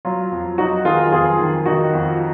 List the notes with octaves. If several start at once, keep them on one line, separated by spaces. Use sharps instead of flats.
F#3 F4
F2
F#3 D#4 F#4
D#3 F4 G#4
F2 F4 G#4
D#3
D#3 D#4 F#4
F2